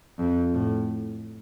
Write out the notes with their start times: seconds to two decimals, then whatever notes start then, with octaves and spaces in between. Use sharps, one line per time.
0.19 F2
0.54 A2